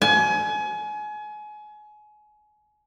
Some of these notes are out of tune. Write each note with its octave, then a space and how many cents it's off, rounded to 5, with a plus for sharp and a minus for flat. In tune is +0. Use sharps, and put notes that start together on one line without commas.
G#5 +30